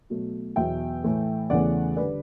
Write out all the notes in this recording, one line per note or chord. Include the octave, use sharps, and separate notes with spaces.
B2 F#3 A3
E2 B2 F#3 E5 G5
A2 E3 A3
E2 C#3 E3 A3 D5 F#5
D3 G3 B4 D5